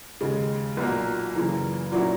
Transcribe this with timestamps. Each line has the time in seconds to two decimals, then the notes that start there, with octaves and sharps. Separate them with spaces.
0.21 D#2 C#3 G#3
0.77 B1 A#2 F#3 A#3
1.34 F#2 C#3 E3 A#3
1.92 A#2 F#3 A#3 C#4 E4